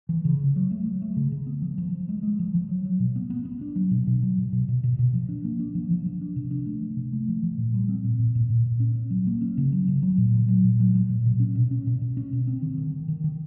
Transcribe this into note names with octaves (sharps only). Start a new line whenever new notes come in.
E3
C#3
C#3
F#3
A3
F#3
A3
C#3
C#3
B3
F3
F3
F3
G#3
G#3
F3
F3
F#3
F#3
B2
B3
B3
B3
D4
F#3
B2
B2
F#3
B2
B2
B2
B2
B2
F3
D4
A#3
D4
F3
F3
F3
D4
C3
D4
A3
F3
C3
A3
F3
F3
A#2
G3
C4
A#2
A#2
A#2
A#2
A#2
C#4
C#4
F#3
A#3
C#4
C#3
F#3
C#3
F#3
A#2
F#3
F#3
A#2
F#3
F#3
A#2
B2
C#4
B2
C#4
B2
B2
C#4
B2
C4
D#3
D#3
D#3
D#3
D#3